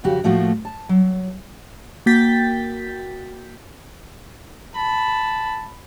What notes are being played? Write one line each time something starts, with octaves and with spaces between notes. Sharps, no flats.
F2 C#3 F#4 G4
A2 F3 A3 A#3 F#4
A5
F#3
A#3 F#4 G5 G6 A6 B6
A5 B5